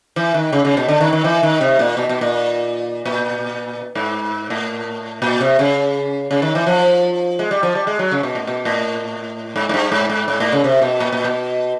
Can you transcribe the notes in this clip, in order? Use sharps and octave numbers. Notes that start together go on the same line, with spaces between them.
E3
D#3
C#3
C#3
B2
D3
D#3
D#3
E3
D#3
C3
A#2
B2
B2
A#2
A#2
G#2
A2
A#2
C3
C#3
C#3
D#3
E3
F3
G#3
G3
F3
G3
G#3
F#3
C#3
B2
A2
B2
A2
G#2
G#2
G2
G#2
G#2
G#2
A2
C#3
C3
B2
A#2
A#2
B2